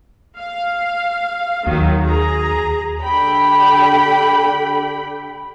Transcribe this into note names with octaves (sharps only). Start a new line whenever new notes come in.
F5
D#2 D#3 F#3
G#4 A#5
D3 G4 G5 B5